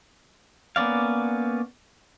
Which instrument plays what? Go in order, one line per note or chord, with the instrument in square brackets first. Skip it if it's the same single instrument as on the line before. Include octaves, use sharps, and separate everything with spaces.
[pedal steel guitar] A#3 B3 C#4 D5 F5